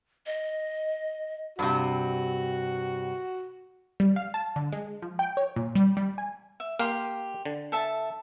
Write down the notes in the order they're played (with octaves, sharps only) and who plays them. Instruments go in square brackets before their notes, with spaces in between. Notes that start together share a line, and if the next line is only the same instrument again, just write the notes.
[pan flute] D#5
[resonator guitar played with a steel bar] G2 C3 [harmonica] F#4
[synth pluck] G3
F5
A5
D3
G#3
F3
G5
C#5
A#2
G3
G3
G#5
[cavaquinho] E5
[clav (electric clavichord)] A#3 F5 [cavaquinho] G4 C6
[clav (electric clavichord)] D3
[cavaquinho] A4 E5 A5